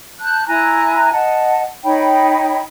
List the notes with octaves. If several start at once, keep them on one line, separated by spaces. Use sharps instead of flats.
A5 F#6 G6
E4 G#5 A#5 F#6
D#5 F#5 A5
D#4 C#5 G5 B5